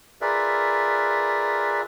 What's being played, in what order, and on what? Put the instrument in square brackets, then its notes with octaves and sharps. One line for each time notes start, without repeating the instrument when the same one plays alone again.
[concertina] F4 G#4 A#4 B4 D5 E5